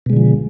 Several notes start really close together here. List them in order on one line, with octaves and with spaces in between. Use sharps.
B2 G#3 D3 F3